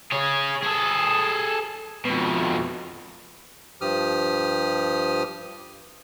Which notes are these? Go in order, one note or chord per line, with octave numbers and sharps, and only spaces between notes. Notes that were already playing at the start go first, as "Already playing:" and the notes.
G#4 C#5
G#4 A4
F2 B2
G2 F3 G4 D#6 F6